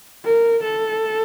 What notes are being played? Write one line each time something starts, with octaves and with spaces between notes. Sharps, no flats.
A#4
A4